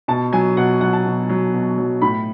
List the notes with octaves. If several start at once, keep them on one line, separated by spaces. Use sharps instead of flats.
B2 A5
F#3 G#5
B2 F#5
F#3 F#5
A5
B2
F#3
B2
F#3
A2 B5